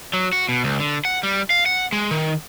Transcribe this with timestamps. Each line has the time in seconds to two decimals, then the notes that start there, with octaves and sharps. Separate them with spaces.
0.13 F#3
0.33 F#4
0.49 B2
0.64 C#2
0.80 D3
1.05 F#5
1.23 G3
1.50 F5
1.66 F#5
1.92 G#3
2.11 D#3